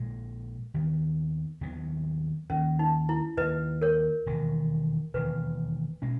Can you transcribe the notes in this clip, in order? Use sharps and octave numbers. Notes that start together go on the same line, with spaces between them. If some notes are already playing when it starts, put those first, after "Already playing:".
Already playing: A#1 A#2 G#3
D#2 D#3 F#3 B3
D#2 D#3 F#3 B3
D#2 D#3 A#3 C#4
D#4
E4
D#2 D#3 A#3 B4 D#5
A#4 C#5
E1 D#2 D#3
E1 D#2 D#3 B4
B2 G#3 C#4